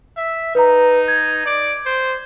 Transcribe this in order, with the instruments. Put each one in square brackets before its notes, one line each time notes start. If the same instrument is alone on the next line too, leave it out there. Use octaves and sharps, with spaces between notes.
[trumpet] E5
[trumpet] D#4 [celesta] B4 A#5
[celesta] G#6
[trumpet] D5
C5